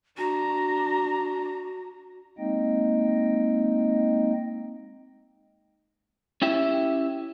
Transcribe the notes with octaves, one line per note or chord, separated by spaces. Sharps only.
D4 F#4 A#5
G#3 A#3 C4 D#4 D#5 G5
C#4 E4 G4 E5